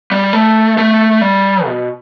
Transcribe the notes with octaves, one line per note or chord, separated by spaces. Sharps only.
G3
A3
A3
G3
B2